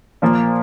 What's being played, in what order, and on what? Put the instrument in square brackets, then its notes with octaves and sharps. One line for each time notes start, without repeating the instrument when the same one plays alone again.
[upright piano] A#2 F3 A#3